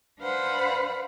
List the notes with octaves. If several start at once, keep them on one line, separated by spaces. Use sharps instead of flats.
D4 B4 C5 F5 F#5 B5